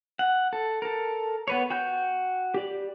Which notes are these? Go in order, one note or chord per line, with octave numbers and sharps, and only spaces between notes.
F#5
A4
A4 A#4
B3 B4 C#5
F#4 G5 G6
G4 D5